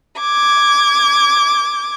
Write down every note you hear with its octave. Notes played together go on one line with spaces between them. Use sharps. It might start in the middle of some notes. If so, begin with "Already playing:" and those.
D6 G#6